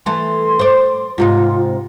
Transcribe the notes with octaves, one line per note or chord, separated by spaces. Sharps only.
E3 A3 C6
C5 D5
G#2 C3 D#4 F4